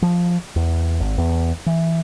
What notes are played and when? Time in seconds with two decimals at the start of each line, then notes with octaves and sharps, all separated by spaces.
0.02 F3
0.56 E2
1.00 G#1
1.18 E2
1.66 E3